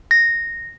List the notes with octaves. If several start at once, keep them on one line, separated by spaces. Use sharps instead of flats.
A#6